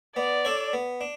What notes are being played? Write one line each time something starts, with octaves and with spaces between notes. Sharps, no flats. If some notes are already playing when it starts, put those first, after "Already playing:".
B3 D5
D4 A4 C#5
B3
D4